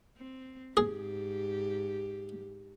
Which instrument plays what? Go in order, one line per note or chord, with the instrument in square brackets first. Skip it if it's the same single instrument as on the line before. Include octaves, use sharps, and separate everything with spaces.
[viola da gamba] C4
[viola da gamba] G#2 G4 [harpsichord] G#4